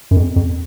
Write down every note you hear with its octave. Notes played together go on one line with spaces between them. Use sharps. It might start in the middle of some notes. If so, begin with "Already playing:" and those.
F#2
F2
F2